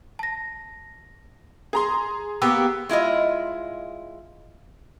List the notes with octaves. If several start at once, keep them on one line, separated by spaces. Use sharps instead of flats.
A5 A#6
G#4 A#5 C6
A#3 B3 G4 E6
G#3 E4 F4 D#5